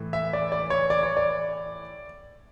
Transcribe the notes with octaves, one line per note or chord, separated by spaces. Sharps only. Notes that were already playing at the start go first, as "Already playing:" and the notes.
Already playing: A2 E3
E5
D5
D5
C#5
D5
C#5
D5